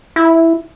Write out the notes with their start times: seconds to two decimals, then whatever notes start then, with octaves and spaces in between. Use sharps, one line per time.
0.16 E4